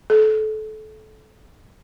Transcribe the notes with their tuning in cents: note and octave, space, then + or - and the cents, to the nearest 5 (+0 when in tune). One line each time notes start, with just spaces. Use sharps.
A4 -25